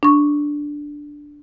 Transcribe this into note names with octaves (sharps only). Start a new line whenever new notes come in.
D4 C#6